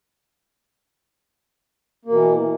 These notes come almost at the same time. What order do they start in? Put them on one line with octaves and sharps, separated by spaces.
A#3 B2 E3